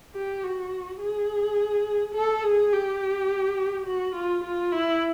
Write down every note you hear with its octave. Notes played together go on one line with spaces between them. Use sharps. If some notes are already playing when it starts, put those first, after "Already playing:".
G4
F#4
G#4
A4
G#4
G4
F#4
F4
F4
E4